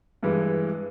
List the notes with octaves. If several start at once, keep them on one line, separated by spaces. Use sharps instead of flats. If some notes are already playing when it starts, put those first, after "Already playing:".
G2 E3 G#3